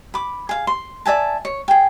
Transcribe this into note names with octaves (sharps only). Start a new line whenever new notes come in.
B5 D6
G#4 F5
C6
D5 E5 G#5 A5
C#5
G#4 G5